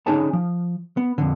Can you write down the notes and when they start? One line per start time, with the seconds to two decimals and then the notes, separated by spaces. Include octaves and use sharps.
0.07 D3 C#4 D#4 G#4 C#5 A5
0.33 F3
0.97 B3
1.18 F2 G#2 D3